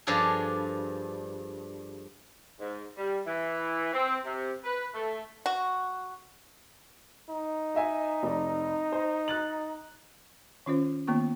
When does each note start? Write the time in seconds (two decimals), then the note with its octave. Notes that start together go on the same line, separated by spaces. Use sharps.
0.07 G2 F3 D4 G#4 A4
2.60 G#2
2.97 G3
3.26 E3
3.93 C4
4.25 C3
4.64 B4
4.94 A3
5.46 F#4
7.30 D#4
7.75 D#5 E5 G#5
8.23 F1 D5
8.92 C5
9.28 F#6 A6 F#7
10.66 D#3 C#4 F4 C5
11.07 D#3 A#3 B3 F4 C#6